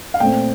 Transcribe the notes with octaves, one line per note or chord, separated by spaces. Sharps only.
F5
A#2 A3 C4 G5